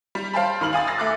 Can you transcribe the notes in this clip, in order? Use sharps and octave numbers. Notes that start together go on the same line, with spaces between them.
G3
C5 F5 G5 A5 B5
G#1 D#3 B5 F6 F#7
F5 G#5 D#6 A6
E6 A6 A#6 C7
A3 D6 F#6